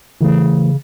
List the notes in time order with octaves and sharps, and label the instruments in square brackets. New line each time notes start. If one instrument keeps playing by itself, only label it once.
[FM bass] C#3 [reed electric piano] E3 A3